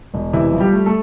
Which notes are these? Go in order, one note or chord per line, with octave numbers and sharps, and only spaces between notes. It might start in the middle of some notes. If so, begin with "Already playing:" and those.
E1
C3 E3 E4
F3
G3 G4
A3
A3 A4